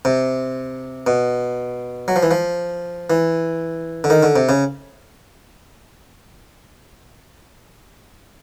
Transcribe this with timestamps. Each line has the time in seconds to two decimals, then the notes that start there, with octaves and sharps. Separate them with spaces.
0.05 C3
1.07 B2
2.08 F#3
2.16 F3
2.23 E3
2.31 F3
3.10 E3
4.04 D3
4.10 D#3
4.23 D3
4.36 C3
4.49 C#3